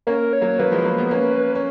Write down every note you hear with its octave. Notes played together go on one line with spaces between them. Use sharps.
A#3 C#4 A#4
C#5
F#3 A#3
F#3 A#3 B4
F3 G#3
F#3 A#3
G#3 B3
A#3 C#4
C#4